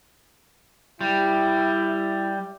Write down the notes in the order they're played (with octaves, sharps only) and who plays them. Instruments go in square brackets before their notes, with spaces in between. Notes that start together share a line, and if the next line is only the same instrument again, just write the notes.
[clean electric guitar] G3 [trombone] E4